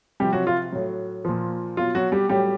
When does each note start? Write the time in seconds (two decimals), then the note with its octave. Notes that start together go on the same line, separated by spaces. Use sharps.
0.20 C3 F3 G3 G4
0.33 F#3 F#4
0.47 F4
0.72 A2 F#3
1.25 A#2 F3
1.77 B2 F#3 F4
1.95 F#3 F#4
2.12 G3 G4
2.29 A2 F#3 G3 G4